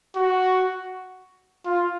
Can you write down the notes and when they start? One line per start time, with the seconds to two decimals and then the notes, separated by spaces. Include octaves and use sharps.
0.16 F#4
1.66 F4